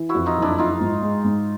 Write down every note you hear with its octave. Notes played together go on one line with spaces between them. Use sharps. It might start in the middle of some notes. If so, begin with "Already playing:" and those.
Already playing: E3
E4 F#4
F2
D#4 F4
F#1
D4 E4
F3 D#4 F4
G#2
G#3
G#2